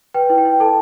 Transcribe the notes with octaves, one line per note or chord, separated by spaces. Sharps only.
B4 G5
E4
G5
E4
A4 A5